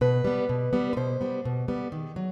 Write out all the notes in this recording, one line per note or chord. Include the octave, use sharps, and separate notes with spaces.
B2 B4
G3 B3
B2
G3 B3
B4
B2 C5
G3 B3
B2
G3 B3
D#3
F#3